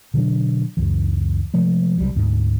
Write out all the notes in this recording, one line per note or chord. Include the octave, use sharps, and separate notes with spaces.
B2 D3 F#3 D4
C#2 F#2 E3
C3 F3 G#3 A3
C2 F#3 G3
D2 G#2